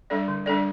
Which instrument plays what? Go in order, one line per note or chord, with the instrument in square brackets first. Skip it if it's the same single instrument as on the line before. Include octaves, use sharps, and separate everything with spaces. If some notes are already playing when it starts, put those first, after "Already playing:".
[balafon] G3 D4 A4 D5
D3
G3 D4 A4 D5